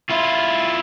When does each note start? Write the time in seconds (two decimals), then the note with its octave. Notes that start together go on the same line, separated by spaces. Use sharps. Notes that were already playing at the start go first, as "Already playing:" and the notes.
0.10 E4 F4